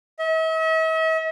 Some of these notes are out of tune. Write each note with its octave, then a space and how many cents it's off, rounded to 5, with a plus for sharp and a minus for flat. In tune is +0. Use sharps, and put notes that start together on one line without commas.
E5 -45